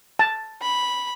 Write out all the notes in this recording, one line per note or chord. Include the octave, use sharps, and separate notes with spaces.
A5
B5